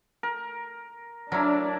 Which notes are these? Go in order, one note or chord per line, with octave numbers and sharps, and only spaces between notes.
A#4
F#3 D4 E4 A#4